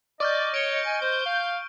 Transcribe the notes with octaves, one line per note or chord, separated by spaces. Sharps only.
D5 D#5 C#6 F6 G6
C#5 C#7 D7 G7
G#5
C5 G6
F5